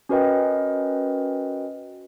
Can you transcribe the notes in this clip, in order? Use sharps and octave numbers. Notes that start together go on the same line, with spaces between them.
C#4 F#4 A#4 B4 D#5 G5